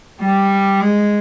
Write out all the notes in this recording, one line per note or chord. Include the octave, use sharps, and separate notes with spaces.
G3
G#3